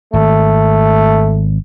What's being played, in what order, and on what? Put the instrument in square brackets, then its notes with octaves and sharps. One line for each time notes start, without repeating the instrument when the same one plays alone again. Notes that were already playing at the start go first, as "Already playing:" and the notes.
[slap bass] G#1 [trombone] A3